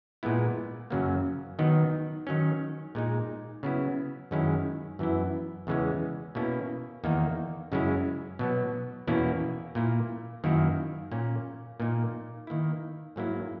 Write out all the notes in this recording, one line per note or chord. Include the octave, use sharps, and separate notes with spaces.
A#2 G#3 B3 E4
F#2 C#3 F#3 A#3
D#3 F#3 B3 D#4
D#3 F#3 C#4
A#2 G#3 D#4
C#3 F#3 B3 E4
F#2 D#3 G#3 C#4 E4
F#2 E3 B3 E4
E2 C#3 E3 G#3 C#4
B2 A#3 C#4 E4
E2 D#3 A#3 D#4
F#2 C#3 G#3 C#4 E4
B2 F#3 B3
E2 B2 A#3 C#4 E4
A#2 A#3 E4
F#2 D#3 A#3 E4
A#2 A#3 C#4
A#2 A#3 D#4
D#3 A#3 E4
G#2 F#3 A#3 E4